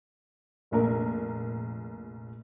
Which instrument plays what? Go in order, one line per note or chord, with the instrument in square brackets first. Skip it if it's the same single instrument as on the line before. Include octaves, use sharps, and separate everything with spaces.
[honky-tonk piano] F1 A#1 A#4